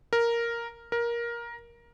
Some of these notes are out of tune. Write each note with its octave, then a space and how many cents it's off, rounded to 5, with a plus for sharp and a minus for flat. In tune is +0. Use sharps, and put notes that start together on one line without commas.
A#4 +0
A#4 +15